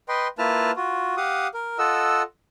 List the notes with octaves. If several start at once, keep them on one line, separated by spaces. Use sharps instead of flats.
B4 D#5 G5 C6
A#3 E4 F4 B4 A5 F6
F4 F#4
G4 F5 F#5 D#6
A#4
F4 A4 D#5 F#5 E6